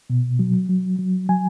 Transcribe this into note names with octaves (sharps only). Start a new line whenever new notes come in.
B2
F#3
F#3
F#3
F#3 G#5